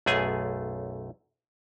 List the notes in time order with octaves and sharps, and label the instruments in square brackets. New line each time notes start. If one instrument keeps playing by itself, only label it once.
[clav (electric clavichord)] B1 F#2 A3 G#4 G#5